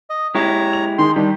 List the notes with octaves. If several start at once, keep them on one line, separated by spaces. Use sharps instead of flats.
D#5
G#3 E4 G4 C#5 A#5
F7
D#3 G#3 C6
D#3 G3 D4